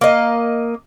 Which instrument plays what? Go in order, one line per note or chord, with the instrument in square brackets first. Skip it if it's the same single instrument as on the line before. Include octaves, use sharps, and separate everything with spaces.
[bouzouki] A#3 D#5